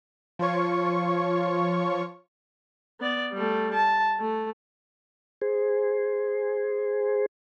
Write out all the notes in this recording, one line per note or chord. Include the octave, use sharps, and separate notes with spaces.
F3 F4 C#5 C#6
B3 D5
G3 A3
A5
A3
G#4 C5